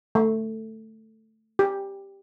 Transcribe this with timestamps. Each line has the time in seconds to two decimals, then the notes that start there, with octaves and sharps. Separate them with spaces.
0.15 A3
1.59 G4